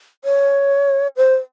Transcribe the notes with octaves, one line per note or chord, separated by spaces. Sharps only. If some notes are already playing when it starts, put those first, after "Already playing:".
C#5
C5